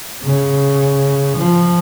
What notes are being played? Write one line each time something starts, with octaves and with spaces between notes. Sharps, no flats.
C#3
F3